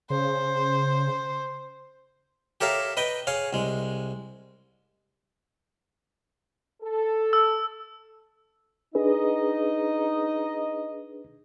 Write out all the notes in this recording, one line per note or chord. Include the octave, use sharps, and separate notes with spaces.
C#3 C5
G4 A4 A#4 C#5 E5 F5
B4 D#5 G5
G#4 C#5 F5
C2 G#3
A4
E6
D4 D#4 G#4 B4 D#5